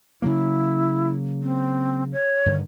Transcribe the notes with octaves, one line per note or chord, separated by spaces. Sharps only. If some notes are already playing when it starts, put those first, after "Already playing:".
C#3 F#3 A#3 E4
C4
C#5
G2 D3 D#3